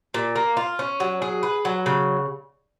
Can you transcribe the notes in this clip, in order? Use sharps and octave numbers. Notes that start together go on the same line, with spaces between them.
A#2
A#3
F4
C#4
F#3
G#4
B4
F#3
C#3